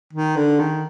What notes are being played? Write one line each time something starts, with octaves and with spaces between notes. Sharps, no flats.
D#3
D3
D#3